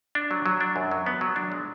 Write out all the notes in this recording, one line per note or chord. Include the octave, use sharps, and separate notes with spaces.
D4
F#3
F#3
D4
F#2
F#3
B3
F#3
D4
G#3